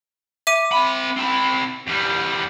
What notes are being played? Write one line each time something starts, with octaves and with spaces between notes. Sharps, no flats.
E5 D6 D#7
C4 B5
C4 E4
E2 G3